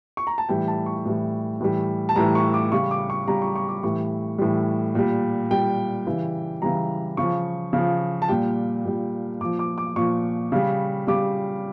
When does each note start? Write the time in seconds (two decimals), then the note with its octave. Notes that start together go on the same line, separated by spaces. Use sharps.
0.17 C#6
0.27 A#5
0.38 A5
0.49 A2 E3 G3 G5
0.68 A5
0.86 C#6
1.05 A2 E3 G3
1.61 A2 E3 G3
2.09 A5
2.16 A2 E3 G3 A#5
2.35 C#6
2.54 D6
2.72 C#3 G3 C#6
2.91 D6
3.10 C#6
3.28 C#3 G3 A#5
3.42 C#6
3.56 C#6
3.69 D6
3.83 A2 E3 G3 C#6
4.38 A2 E3 G3
4.95 A#2 G3
5.50 A#2 G3 G5
6.07 C#3 E3 G3
6.62 C#3 E3 G3 A#5
7.17 C#3 F3 C#6
7.73 C#3 F3
8.22 A5
8.29 A#2 G3 G5
8.85 A#2 G3
9.41 A#2 F3 D6
9.59 D6
9.78 D6
9.96 A#2 F3 C#6
10.52 C#3 G3
11.07 C#3 G3 D6